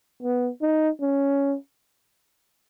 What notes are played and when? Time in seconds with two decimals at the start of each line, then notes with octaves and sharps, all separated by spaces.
0.23 B3
0.62 D#4
1.01 C#4